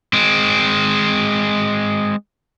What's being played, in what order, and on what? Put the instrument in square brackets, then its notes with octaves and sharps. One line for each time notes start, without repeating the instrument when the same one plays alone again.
[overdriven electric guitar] G#3 C4